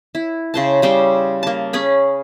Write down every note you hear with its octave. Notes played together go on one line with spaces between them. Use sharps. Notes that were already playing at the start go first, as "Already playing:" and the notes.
E4
C#3 C5 A5
C#3 G3 C5 G5
A#3 A5
C#4 G#4 B5